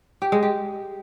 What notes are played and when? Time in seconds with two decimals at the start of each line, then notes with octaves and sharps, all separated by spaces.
0.22 G4
0.32 G#3
0.43 G4